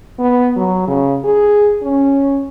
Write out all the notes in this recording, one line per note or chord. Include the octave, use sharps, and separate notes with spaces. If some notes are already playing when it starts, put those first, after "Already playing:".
B3
F#3
C#3
G#4
C#4